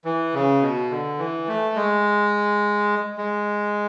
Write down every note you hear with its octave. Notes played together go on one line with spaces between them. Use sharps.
E3
C#3
B2
D3
E3
A3
G#3
G#3